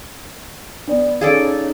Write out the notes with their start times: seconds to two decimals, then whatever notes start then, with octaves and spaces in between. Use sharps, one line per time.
0.88 B3 D4 D5
1.21 C#4 D#4 G#4 A4 D5 F5